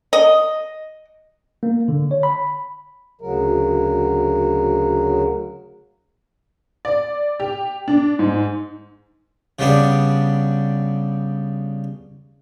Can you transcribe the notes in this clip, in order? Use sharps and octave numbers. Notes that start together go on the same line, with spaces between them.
D#5
A#3
D3
C#5
B5
D2 C#3 F#3 A#4
D5
G4
D4
G#2
C#3 G3 B3 D4